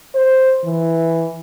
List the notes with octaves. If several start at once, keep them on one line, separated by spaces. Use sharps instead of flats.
C5
E3